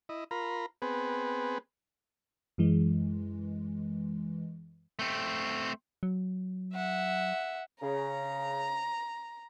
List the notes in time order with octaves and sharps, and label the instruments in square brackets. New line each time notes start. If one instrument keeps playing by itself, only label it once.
[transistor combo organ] E4 D#5
F4 A#4 A#5 B5
B3 C4 G#4 B4
[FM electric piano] F#2 E3 G#3
[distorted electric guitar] A3 C4
[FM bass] F#3
[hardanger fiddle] E5 F#5
[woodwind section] C#3 [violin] A#5